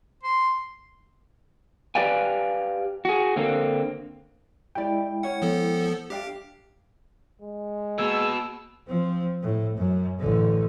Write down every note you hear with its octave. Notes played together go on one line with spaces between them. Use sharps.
C6
G4 B4 D5 F5 G5 G#5
F#4 G#4
D3 A#3 C4
G#3 E4 G4 D5 G5
C#4 C#5 F#5
F3 B3 A4
D4 G4 F5 G5
G#3
B2 A#3 G#4 E6
F3 C4
A2
F#2
A1 D3